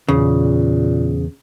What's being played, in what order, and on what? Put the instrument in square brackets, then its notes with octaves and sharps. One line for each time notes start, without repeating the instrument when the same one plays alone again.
[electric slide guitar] E2 [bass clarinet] A#2 [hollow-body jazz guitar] C#3